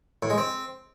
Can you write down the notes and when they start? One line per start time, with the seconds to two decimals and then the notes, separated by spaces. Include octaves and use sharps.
0.23 A2
0.30 G#3
0.38 C4